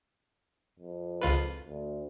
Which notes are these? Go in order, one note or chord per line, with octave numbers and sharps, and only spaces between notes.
F2
C#2 F4 B4
D2